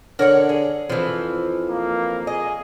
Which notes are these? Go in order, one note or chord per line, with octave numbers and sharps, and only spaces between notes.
D3 A#4 C#5 F#5
G#4
F2 E3 F3
A#3
G#4 D#5